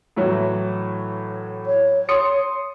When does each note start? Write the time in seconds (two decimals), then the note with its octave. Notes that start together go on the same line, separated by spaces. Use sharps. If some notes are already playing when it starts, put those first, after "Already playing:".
0.16 A2 E3 F#3
1.66 C#5
2.09 C6 D#6 C#7